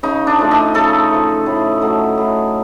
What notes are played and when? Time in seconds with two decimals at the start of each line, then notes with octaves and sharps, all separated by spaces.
0.03 C#3 D#4
0.27 D4
0.39 F3 A3
0.51 D#4
0.74 C#3 A4
1.10 F3 A3
1.46 A2
1.82 F#3 A3
2.18 A2